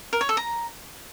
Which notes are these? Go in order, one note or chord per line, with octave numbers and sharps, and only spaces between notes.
A#4
C#5
A4
A#5